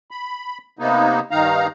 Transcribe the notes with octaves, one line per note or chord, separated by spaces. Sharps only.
B5
C3 A#3 B3 D#4
G2 D#3 D#4 F5 A#5